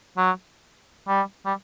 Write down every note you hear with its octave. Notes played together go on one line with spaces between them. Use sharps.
F#3
G3
G3